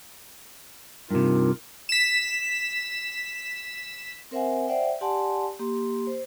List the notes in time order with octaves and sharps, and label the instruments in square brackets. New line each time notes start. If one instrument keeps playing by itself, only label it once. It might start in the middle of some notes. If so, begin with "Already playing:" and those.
[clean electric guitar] G2 C3 [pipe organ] D#4 F4 A#4
[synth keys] B6 E7
[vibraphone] C4 A#4 C5 E5 F#5 G#5
C5 D5 E5 F#5 G5
G4 D5 F#5 G#5 A5 C6
A#3 G4 C6
C5